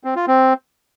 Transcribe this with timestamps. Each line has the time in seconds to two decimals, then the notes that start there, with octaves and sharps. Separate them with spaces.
0.04 C4
0.16 F4
0.27 C4